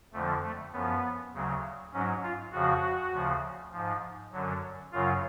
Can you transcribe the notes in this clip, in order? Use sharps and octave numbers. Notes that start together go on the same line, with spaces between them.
F2 D3 F3 A3
A3
F#2 F3 B3
D2 C#3 F#3
G#2 F#3 C#4
F4
F2 C#3 F3 F#4
D2 C#3 F3
G#2 F3
F#2 D3 F#3
F#2 C#3 F#3 F4